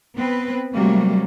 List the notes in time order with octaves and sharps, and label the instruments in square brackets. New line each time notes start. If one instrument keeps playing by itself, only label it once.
[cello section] B3 C4 B4
C3 F#3 G3 A3 A#3